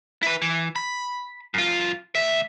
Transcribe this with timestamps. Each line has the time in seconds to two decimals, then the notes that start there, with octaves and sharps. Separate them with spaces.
0.23 E4 B4
0.42 E3
0.76 B5
1.54 F#2 F4
2.15 D2 E5